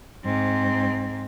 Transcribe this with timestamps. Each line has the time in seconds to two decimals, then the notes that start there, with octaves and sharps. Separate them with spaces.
0.24 G#2 C4